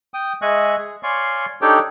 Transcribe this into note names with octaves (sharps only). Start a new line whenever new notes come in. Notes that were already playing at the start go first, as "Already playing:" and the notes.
G5 D#6
G#3 D#5 E5 G#5 C#6 F#6
G#4
C#5 D5 F5 G#5 C6 C#6
D4 D#4 G4 A4 C#5 G5